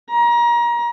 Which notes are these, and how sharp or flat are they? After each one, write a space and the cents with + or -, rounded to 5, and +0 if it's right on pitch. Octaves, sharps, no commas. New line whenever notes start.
A#5 +30